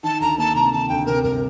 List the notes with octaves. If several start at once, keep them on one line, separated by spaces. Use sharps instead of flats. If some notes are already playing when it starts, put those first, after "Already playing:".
D#3 A5
D2 A#5
A#3 A5
C3 A#5
D#3 A5
D2 G5
C3 A#4
G1 A#4